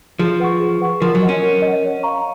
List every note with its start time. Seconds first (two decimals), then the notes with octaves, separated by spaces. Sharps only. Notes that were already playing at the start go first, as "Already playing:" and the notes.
0.19 F3 G#4
0.40 B4 F#5 C#6
0.60 G#4
0.81 B4 F#5 C#6
1.00 F3 A#4
1.15 F#3
1.22 D#5 F#5
1.29 C#4
1.42 A#4
1.62 D#5
1.67 F#5
1.83 C#5
2.03 F5 A#5 C#6